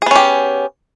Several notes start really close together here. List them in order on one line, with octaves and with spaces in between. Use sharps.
G#4 B3 C#4 G4